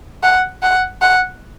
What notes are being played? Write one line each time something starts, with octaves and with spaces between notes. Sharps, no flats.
F#5
F#5
F#5